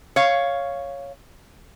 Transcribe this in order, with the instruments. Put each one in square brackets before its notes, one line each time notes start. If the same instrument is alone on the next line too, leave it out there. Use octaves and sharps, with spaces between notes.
[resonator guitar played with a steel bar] C#5 F5